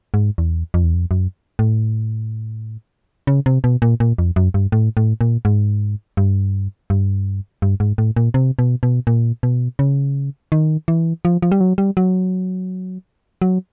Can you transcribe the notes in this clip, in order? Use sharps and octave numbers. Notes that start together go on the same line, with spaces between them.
G#2
E2
F2
E2
F2
F#2
A2
C#3
C3
B2
A#2
A#2
F2
F#2
G2
A2
A2
A#2
G#2
G2
G2
G2
G#2
A2
A#2
C3
B2
B2
A#2
B2
C#3
D#3
E3
F3
F3
G3
F#3
G3
F#3
F#3